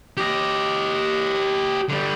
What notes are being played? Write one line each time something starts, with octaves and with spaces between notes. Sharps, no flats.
G4 D#5
D3 G3